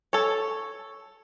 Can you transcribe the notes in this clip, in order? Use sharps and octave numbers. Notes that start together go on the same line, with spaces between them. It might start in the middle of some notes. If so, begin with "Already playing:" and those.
A4 C#5